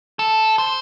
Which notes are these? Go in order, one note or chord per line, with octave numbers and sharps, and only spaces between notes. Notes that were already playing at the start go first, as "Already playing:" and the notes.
A4
C5